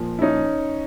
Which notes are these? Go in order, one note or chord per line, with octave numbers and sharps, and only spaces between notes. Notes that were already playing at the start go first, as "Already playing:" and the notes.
Already playing: A#2 F3
E4
C#4 D#4